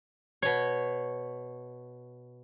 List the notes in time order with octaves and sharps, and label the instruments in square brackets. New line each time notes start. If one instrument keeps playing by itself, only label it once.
[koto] B2 C#5